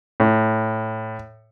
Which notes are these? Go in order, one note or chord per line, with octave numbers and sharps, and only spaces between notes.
A2